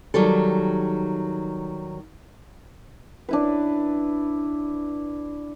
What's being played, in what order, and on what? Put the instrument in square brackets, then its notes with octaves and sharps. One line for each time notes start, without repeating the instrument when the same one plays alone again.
[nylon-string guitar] D#3 F#3 G3 A4
[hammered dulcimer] D4 E4 B4